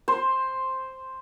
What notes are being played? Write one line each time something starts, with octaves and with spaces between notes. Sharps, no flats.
C5